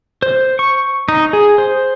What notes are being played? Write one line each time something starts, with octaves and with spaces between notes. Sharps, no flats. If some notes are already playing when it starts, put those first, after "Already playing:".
C5
C#6
D#4
G#4
C5